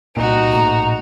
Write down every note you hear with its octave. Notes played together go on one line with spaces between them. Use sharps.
C2 A#2 D#4 F#4
A#1 A2 A#5